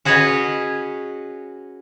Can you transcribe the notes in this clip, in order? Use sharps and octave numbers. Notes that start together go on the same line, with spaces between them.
C#4 F#4 G#4 B4 C#5 D#5